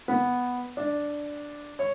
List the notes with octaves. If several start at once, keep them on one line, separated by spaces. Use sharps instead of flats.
B3
D4
C#5